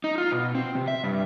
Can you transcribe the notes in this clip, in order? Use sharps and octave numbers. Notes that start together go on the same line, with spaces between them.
D#4
F4
B2
C4
C3
E5
G2